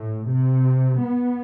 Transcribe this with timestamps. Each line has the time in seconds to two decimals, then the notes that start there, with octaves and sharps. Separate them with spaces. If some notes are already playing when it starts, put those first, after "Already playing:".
Already playing: A2
0.27 C3
1.01 B3